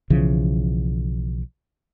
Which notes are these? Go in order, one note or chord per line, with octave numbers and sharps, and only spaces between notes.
B1 C#3 E3 F3